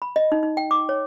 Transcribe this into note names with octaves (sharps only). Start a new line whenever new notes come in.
B5
D#5
D#4
D#4
G5
D6
C#5